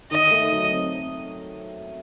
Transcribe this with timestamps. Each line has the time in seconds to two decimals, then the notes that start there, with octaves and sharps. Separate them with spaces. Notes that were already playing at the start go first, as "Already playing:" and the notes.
0.11 D#3 D#5
0.31 A3
0.52 F#3
0.72 C4